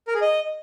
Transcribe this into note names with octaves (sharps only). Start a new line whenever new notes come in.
A#4
G#4
D#5